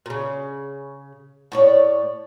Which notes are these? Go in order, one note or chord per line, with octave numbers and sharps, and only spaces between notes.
A#2 C#3
A2 C#5 D5